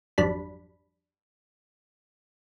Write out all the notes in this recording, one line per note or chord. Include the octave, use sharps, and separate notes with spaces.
G#1 F2 F#3 G3 D4 B5